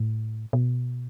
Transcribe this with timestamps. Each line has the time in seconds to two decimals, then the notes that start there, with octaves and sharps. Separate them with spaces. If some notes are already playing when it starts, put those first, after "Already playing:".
Already playing: A2
0.53 B2